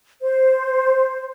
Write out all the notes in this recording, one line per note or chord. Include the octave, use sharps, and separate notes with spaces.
C5